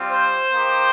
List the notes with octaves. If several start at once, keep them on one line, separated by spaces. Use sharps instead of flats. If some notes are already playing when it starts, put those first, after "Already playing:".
Already playing: G3 C4 F4
C5
A#3 D#4 G4